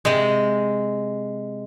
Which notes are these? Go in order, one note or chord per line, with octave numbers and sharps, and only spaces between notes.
C3 G#3